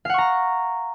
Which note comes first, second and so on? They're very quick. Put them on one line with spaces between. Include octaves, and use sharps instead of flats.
F5 F#5 C#6 A#5